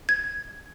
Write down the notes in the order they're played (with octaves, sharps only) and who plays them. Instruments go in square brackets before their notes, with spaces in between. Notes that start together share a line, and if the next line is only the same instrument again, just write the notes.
[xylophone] G#6